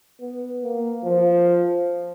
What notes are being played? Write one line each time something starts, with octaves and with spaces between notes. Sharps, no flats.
B3
A#3
F3